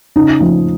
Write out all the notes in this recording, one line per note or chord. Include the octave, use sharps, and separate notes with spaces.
C#3 D#4
F3